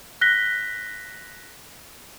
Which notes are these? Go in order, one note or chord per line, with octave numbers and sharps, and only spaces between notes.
F#6 A#6 B6 G7